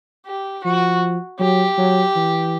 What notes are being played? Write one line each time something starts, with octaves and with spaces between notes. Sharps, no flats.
G4
F3 F#4
F#3 G4
F#3
E3